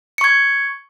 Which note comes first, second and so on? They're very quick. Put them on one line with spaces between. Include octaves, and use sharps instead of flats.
C#7 C#6 G#6